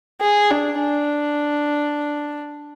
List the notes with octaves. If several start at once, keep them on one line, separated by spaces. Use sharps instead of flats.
G#4
D4
D4